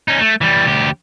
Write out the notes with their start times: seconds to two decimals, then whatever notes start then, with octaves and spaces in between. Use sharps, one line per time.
0.08 C#4 D#4
0.21 A3
0.41 E3 G3
0.67 D2 G4